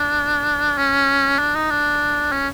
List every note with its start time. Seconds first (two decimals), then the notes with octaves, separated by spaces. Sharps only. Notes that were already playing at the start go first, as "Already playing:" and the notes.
Already playing: D4
0.78 C#4
1.39 D4
1.55 D#4
1.70 D4
2.32 C#4